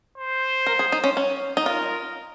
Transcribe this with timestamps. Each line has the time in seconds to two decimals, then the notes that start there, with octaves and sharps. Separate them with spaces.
0.18 C5
0.67 A#4
0.79 G#4
0.92 D#4
1.04 C#4
1.17 C#4
1.57 D#4
1.65 F4 A#4